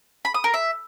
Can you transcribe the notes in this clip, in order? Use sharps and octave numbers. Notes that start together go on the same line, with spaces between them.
B5
D#6
A#4
E5